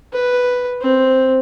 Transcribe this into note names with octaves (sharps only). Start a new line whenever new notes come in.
B4
C4